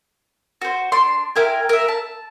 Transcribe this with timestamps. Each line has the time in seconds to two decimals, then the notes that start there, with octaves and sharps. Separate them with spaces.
0.62 F#4 C5
0.92 D4 C6
1.36 E4 G4 A#4 G#5
1.69 A#4 E5
1.88 A5